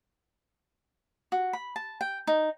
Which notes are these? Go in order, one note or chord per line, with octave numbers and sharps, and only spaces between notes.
F#4
B5
A5
G5
D#4